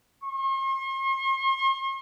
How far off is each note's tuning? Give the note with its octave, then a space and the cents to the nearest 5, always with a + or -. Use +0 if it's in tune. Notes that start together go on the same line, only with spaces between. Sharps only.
C6 +45